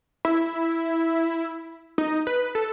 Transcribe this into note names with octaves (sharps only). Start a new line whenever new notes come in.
E4
D#4
B4
A4